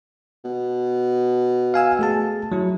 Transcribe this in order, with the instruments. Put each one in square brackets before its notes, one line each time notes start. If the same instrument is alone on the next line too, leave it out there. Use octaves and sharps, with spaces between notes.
[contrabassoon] B2
[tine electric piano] F5 G#5 E6
A3 G#4 A5
F#3 E4